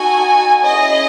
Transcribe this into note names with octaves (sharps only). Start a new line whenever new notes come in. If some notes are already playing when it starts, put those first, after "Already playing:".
Already playing: D#4 F#4 A4 G#5
C#4 E4 G#4 D#5